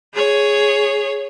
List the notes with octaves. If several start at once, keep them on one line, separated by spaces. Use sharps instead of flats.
G#4 C#5